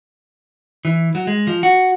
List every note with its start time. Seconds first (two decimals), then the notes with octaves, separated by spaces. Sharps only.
0.85 E3
1.15 F#3
1.27 G#3
1.47 F3
1.63 F#4